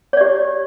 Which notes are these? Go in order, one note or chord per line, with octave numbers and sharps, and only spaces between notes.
G4 C#5 D5